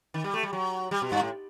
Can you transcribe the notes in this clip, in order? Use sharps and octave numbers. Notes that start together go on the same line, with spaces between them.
D#3
G3
A3
G3
F#3
G3
B2
G2
A2